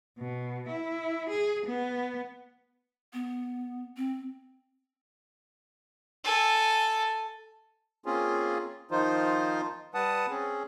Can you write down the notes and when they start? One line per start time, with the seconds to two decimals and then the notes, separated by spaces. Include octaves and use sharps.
0.19 B2
0.69 E4
1.30 G#4
1.66 B3
3.13 B3
3.97 C4
6.24 A4 G#5
8.06 A#3 C4 C#4 F4 G#4
8.91 D#3 F3 D#4 F4 C5
9.94 G3 B4 F#5 A5 D#6
10.29 C4 C#4 G#4